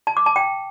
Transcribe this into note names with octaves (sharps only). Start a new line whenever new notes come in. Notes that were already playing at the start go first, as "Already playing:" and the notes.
A5
D6
A5
G5